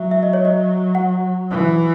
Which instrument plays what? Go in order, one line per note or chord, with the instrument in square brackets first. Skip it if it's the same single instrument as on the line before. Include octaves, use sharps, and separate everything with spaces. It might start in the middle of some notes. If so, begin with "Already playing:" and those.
Already playing: [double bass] F#3 [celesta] E5
[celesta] E5
D#5
C#5
D#5
F#5
[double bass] E3